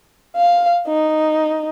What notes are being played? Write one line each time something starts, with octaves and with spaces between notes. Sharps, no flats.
F5
D#4